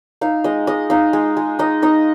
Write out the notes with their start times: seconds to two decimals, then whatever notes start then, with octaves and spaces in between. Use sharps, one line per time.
0.21 D#4 F5
0.44 G#3 D#5
0.67 G#3 D#5
0.90 D#4 F5
1.13 G#3
1.37 G#3
1.59 D#4 D#5
1.82 D#4 D#5